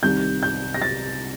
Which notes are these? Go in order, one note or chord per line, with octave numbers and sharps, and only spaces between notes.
C2 C3 D#3 G6
G6
A#6
A6